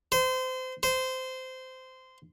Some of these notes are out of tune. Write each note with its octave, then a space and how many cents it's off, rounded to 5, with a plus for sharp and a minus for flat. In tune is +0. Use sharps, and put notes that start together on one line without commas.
C5 -25
C5 -15